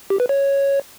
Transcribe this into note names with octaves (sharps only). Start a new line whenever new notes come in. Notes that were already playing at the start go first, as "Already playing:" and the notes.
G4
B4
C#5